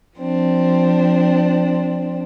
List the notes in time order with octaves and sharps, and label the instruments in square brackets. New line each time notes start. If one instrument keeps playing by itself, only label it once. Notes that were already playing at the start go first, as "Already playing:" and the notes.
[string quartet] F3 C4 D4